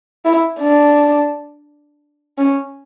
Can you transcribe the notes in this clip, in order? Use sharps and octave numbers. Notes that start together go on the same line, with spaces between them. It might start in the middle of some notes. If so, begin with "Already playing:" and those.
E4
D4
C#4